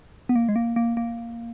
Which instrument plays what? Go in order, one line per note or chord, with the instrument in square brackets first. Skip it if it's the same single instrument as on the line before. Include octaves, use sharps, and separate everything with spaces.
[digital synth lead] B3
A#3
G#3
A#3
A#3
A#3